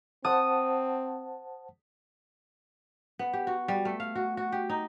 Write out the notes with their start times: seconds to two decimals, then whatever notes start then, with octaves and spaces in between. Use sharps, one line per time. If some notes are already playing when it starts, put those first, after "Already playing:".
0.25 C4 C5 F#5 A5 D#6
3.19 B3
3.33 G4
3.47 F#4
3.68 G3
3.85 A3
4.00 F5
4.15 F#4
4.37 F#4
4.52 G4
4.70 D#4